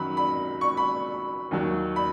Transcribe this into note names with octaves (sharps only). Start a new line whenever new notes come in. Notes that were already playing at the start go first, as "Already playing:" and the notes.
Already playing: F#2 D#3 F#3 B5
B5
C#6
B5
D#2 D#3 F#3
B5